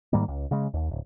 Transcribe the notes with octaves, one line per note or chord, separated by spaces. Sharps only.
G#2 D#3 G3 A#3
C#2
C#3 G#3
D#2
D1